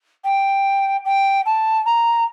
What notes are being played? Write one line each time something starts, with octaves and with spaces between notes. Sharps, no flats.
G5
G5
A5
A#5